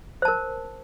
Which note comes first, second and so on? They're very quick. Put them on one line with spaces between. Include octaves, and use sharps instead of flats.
C5 A5 A#4